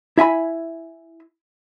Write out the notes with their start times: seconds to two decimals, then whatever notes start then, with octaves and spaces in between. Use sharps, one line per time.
0.18 E4 E5 G#5 B5